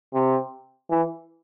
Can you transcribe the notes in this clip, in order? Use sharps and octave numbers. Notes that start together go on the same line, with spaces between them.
C3
E3